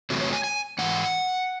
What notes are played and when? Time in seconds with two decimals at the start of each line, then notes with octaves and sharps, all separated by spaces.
0.10 E2 C3 F#3 A3
0.21 C#5
0.33 G#5
0.44 G#5
0.78 G#2 E3 F#5